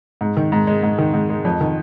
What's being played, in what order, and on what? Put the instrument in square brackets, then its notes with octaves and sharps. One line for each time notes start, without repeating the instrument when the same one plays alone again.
[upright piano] G#2
D#3
G#2
G#3
G#2
D#3
G#2
G#3
F2
D#3